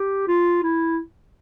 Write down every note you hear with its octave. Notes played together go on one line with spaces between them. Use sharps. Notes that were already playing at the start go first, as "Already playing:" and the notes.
Already playing: G4
F4
E4